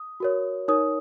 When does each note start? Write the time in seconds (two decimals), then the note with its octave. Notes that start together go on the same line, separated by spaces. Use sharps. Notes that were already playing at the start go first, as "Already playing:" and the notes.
Already playing: D#6
0.20 F#4 A#4 C#5
0.68 D#4 A#4 C#5 D#6